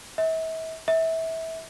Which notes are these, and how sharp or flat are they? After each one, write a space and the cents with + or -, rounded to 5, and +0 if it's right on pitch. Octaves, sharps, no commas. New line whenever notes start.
E5 -40
E5 -20